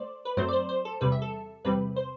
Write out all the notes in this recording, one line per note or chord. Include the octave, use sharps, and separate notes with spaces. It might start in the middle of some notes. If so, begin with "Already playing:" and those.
Already playing: A3 C5 D5
B4
F#2 F#3 A3 C4 C5
D5
C5
C5
A4
E2 C3 G3 B4
E5
A4
E2 C3 G3 C4 B4
C5